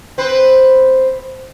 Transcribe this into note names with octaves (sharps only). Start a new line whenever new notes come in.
C4 B4 C5